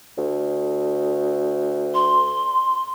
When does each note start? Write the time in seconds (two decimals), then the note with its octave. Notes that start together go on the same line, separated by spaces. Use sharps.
0.18 D2
1.94 C6